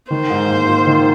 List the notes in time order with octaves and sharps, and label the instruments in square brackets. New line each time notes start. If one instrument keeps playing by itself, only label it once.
[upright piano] D#3 [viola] C5
[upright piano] G#2
A#3
F4
D#3